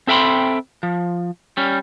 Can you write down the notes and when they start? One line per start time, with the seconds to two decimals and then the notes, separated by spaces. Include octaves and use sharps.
0.07 C4 A4 E5 G5 B5 C6
0.83 F3
1.57 G3 C#4